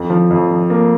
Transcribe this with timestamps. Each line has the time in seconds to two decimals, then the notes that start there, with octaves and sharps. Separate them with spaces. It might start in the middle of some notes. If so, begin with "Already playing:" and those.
Already playing: F2
0.10 F3
0.30 F2
0.51 F3
0.70 A#3